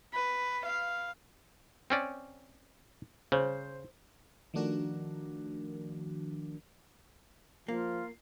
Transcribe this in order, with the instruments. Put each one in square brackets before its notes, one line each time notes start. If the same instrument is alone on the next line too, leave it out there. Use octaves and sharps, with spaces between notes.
[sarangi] B4
F5
[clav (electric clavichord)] C4 C#4 D5
[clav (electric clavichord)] C#3 [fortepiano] C5
[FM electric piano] D#3 F3 A3 D4 F#4 A#4
[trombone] F3 [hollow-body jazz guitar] A#3 [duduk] F4